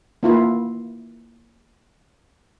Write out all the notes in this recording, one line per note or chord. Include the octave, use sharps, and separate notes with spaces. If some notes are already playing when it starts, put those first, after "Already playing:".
A#3 E4 F4